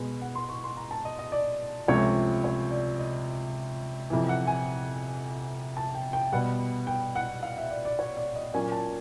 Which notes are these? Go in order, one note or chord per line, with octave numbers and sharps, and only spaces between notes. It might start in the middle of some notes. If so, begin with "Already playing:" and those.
Already playing: B2 G#3 B3
F#5
C6
C#6
C6
A#5
A5
D#5
D#5
D5
C#2 C3 F3 A3 C#4 C#5
C#5
D5
D#5
F2 C3 E3
F#5
G#5
A5
G5
G5
B2 G3 B3 F#5
G5
F#5
F5
E5
D5
D5
C#5
D5
D#5
A#2 F#3 A#3 C#4 G#5
A5